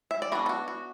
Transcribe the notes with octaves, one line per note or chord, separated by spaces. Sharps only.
E5
D5
E3 B3 D4 F#4 B4
A4
F#4
F#4